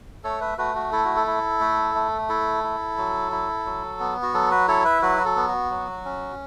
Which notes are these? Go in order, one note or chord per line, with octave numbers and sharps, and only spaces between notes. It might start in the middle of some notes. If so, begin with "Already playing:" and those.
A3 A4 C#5
B4 E5
A3 F#4 B4
F#4
E4 A4
F#4
A4
E4
A3
A3
E4 A4
E4
F#3
E4
F#3
B3
F#4
F#3 A4
F#4 B4
E4 A4 C#5
B4 E5
F#3 F#4 B4
F#4
A4
B3
F#4
F#3
C#4